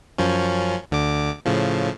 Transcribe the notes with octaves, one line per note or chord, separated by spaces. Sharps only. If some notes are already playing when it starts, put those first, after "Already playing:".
F#2 F3 C#4
D2 D3 D6
A2 C#3 F3